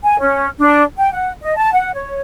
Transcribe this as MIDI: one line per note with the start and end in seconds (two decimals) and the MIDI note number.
0.03 0.19 80
0.19 0.47 61
0.58 0.82 62
0.97 1.10 79
1.12 1.32 78
1.41 1.56 75
1.56 1.71 81
1.73 1.90 78
1.94 2.21 73